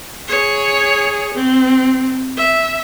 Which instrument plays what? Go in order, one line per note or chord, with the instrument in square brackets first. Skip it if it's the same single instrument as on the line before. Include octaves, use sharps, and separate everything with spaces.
[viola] G#4 C#5
C4
E5